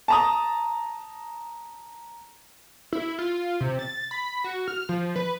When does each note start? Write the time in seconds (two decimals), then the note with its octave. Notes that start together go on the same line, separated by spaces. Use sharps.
0.08 A5 A#5 D#6
2.93 E4
3.19 F4
3.60 C3
3.79 A6
4.11 B5
4.44 F#4
4.68 F6
4.89 F3
5.16 B4